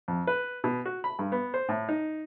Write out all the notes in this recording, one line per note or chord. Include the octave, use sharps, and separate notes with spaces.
F2
B4
B2
F#4
B5
G2
B3
C5
A2
D#4